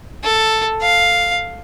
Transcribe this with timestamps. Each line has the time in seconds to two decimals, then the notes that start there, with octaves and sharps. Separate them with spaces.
0.24 A4
0.82 F5